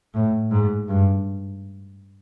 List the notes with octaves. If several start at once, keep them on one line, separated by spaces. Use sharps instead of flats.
A2
G#2
G2